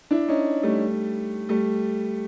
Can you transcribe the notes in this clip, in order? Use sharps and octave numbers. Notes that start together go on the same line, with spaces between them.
D4 E4
C#4 D#4
G3 A3
G3 A3